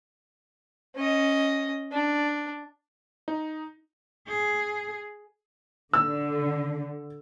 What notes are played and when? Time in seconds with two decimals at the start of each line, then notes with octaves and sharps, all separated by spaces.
0.96 C#4 D#5
1.92 D4
3.28 D#4
4.27 G#4
5.93 D3 E6